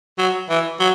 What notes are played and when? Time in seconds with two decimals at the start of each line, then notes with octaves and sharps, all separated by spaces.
0.18 F#3
0.49 E3
0.80 F#3